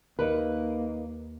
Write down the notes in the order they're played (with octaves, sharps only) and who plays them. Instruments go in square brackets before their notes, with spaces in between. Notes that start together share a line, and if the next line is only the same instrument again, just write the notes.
[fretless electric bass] D#2 [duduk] A#3 [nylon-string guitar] D#4 A#4 B4